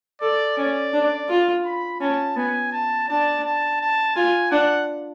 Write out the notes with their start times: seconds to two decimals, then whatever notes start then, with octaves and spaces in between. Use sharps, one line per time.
0.21 A4 D5
0.57 C#4 D5
0.93 D4
1.29 F4
1.65 B5
2.01 C#4 A5
2.37 B3 G#5
2.72 A5
3.08 D4 A5
3.44 A5
3.81 A5
4.16 F4 G#5
4.51 D4 F#5